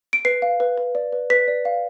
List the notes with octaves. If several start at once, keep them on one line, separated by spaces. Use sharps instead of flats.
D7
B4 C7
F5
B4
B4
D5
B4
B4 B6
D5
F5